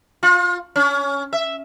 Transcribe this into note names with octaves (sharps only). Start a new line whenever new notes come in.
F4
C#4
E5